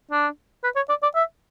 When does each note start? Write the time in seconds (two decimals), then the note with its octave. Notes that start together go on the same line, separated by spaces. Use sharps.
0.11 D4
0.64 B4
0.76 C#5
0.89 D5
1.02 D5
1.15 E5